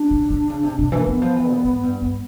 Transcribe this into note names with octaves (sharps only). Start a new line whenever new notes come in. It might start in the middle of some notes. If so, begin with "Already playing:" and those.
Already playing: D4
C#3
D3
C#3
C3
C3
E3
A#3
E3 B3
F3
E3
A#2
G#2
G2
G2